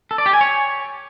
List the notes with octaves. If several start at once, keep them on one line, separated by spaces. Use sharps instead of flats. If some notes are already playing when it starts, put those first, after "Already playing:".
A4
D5
G4
G#5
C#5